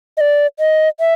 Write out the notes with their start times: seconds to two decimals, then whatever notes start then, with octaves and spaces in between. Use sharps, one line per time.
0.17 D#5
0.21 D5
0.59 D#5
1.00 E5